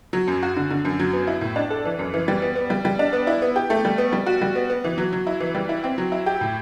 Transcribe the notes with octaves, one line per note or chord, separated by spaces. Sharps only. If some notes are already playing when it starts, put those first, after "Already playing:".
F#3
F#2
F#4
D3
D3
F#2
F#3
B3
E4
A2
D4
A4
E3
F#2
E3
G3
B3
B3
G3
G3
D4
B3
E4
B3
G4
A3
G3
B3
G3
F#4
G3
B3
B3
E3
F#3
F#3
E4
E3
G3
E4
C4
F#3
E4
G4
A2